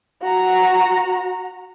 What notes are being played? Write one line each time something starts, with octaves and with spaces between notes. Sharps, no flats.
F#4 A#5